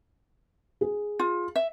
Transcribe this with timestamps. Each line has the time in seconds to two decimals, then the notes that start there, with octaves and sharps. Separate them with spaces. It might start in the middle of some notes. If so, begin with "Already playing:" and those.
0.81 G#4
1.19 F4
1.56 E5